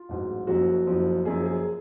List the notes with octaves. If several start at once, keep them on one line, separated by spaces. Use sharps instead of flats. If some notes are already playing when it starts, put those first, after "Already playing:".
Already playing: F4
A1 G#2 F#3
F#1 F#2 F3 F#4
F#1 F#2 F3
F#1 F#2 F3 G#4
G#4